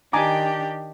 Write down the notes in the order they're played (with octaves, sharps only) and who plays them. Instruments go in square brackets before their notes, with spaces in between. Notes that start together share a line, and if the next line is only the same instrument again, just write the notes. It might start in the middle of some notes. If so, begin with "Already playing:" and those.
[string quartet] D#3 D4 G4 [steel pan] G#5 A#5 D6